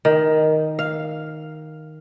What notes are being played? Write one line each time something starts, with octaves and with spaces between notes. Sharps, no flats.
D#3
F5